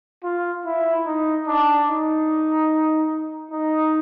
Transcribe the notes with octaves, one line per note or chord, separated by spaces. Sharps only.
F4
E4
D#4
D4
D#4
D#4